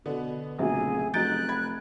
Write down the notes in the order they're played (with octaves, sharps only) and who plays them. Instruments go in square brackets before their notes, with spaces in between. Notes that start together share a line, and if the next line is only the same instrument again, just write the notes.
[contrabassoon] B2 [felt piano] D3 [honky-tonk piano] B3
[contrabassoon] F1 [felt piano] A#1 C#3 F#3 [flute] G#4
[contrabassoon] F1 [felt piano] F#3 D#4 [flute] F#6 [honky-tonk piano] G6 A6 D7
[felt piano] B5 G#6